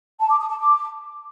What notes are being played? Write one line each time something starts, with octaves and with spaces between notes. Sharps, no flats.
A5
D6
D#6
A5
D6